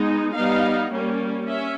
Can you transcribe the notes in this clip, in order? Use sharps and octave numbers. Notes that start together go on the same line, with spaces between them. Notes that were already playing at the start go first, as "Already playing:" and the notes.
Already playing: G#3 B3 D#4
G3 B3 D#4 F5
G3 A#3 C#4
C#4 E5